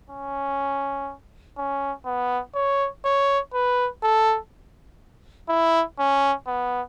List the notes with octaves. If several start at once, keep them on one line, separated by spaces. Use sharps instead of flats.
C#4
C#4
B3
C#5
C#5
B4
A4
E4
C#4
B3